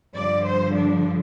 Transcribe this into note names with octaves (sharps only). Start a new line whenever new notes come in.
G2 D3 F3 D5
C5
D4